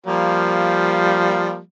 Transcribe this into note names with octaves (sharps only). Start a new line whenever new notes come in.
F3 G3 A#3